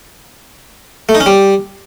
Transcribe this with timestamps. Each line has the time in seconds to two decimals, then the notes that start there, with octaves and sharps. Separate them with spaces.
1.09 A3
1.15 D#4
1.20 C#4
1.26 G3